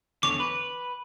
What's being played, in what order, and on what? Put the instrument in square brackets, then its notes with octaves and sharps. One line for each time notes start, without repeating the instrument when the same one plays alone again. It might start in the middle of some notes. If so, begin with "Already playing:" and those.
[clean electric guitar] E2 D3 C#5 [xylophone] D6
[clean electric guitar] B4